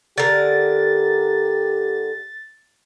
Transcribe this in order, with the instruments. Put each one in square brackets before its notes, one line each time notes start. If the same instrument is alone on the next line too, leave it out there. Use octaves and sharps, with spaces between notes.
[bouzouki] D3 A#4 [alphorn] G4 [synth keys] A6